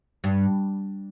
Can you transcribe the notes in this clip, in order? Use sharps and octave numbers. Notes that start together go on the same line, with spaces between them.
G2